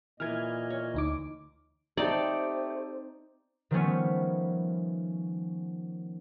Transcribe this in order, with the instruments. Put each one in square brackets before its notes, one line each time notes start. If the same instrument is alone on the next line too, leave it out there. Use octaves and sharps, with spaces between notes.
[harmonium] A#2 A#3 D#5 [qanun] E3 B4 [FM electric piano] F6 G#6
[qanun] C#5
[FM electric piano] D2 D#4 D6
[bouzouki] A3 G4 [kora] C4 D#4 [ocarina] C5 [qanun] D5
[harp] D#3 F3 G3 A3 B3 C#4